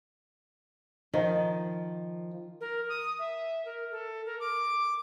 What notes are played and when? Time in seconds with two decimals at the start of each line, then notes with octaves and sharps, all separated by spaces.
1.14 D#3 F3
2.61 A#4
2.89 D#6
3.19 E5
3.65 A#4
3.91 A4
4.26 A#4
4.40 D6